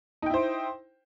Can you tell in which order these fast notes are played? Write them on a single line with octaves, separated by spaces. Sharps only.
D#4 G5 E4 C5